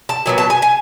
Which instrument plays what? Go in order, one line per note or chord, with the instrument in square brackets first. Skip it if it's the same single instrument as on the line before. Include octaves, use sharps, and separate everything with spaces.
[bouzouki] A5
A#2 F#3 B3
A5
G#5
G#5